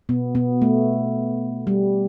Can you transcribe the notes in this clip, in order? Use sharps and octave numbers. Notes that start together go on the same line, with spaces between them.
B2 B3
B2 B3
A3
G3